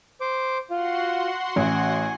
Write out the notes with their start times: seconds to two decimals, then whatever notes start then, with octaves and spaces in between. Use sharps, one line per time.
0.21 C5 D6
0.70 F4 F#4 F#5 C6
1.56 A1 G#5